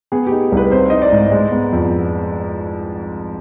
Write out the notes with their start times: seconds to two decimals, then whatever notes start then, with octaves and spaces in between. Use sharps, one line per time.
0.12 B3 G#4
0.27 D#4 G4
0.52 C2 B4
0.71 C4 C5
0.90 D#4 D#5
1.02 D5
1.12 G#2
1.32 G#3
1.51 B3
1.72 F2